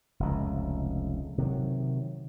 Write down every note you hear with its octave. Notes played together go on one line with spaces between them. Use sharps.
F1 C#2
C3 D#3 F#3